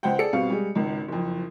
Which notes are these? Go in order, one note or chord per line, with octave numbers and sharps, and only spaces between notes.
C#2 C5 F#5 G5
G#4 A4 D5 C#7
B2 G3 B3 C4 F5
G3 G#3
G#1 C#2
F#1 F2